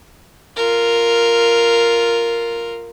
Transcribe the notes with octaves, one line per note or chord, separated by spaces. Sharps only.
F4 A#4